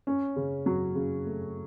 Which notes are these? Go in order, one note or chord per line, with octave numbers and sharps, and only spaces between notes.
C#4
C#3
F#3
C#3
A3